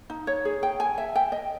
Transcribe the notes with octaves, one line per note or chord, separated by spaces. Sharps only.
D#4
C#5
G#4
G5
G#5
E5
G5
D#5